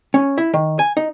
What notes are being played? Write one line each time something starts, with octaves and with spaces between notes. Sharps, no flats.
C#4
E4
D#3
G#5
D#4